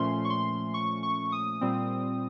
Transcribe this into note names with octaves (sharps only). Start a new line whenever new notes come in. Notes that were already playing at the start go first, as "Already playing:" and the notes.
Already playing: A#2 F3 A3 C#4 C6
C#6
C6
C#6
C#6
D#6
A#2 G3 C4